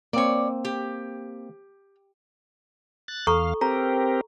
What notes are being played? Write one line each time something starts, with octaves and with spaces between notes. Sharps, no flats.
A#3 C4 C#5 D5
G4
F#6 A6
E2 A4 F5 A#5 C#6
C4 G4 A#4 A#5